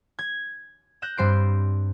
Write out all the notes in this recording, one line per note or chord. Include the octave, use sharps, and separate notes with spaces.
G#6
F#6 G6 A#6 E7
G2 G3 C4 C5 C7 D7